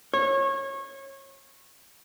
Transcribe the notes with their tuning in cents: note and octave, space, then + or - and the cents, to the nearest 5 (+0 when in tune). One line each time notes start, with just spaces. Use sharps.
C#5 -25